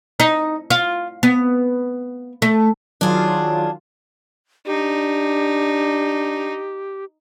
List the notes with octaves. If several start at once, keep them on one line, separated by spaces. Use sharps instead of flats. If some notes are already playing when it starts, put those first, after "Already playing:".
D#4
F4
B3
A3
D#3 F#3 D4 F4 G#4
D4 D#4 G4